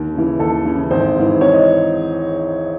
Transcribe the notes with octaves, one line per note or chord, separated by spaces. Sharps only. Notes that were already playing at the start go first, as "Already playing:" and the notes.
Already playing: D#2
C#3 E3
D#2 A4
C#3 E3
G#1 C5
G#2 E3
G#1 C#5
D#5